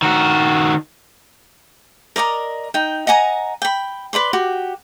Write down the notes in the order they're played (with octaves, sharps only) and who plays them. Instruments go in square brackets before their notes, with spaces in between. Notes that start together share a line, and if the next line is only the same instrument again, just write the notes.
[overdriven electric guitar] D#3 F#4
[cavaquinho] A#4 D5 D#5 A#5
D#4 G5
D#5 F#5 G#5 A#5
G5 B5
B4 D5 B5 C6
F#4 G4